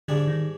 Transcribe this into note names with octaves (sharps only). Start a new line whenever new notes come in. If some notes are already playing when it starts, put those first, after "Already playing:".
G#2 D3 G3 D4 G#4
D#3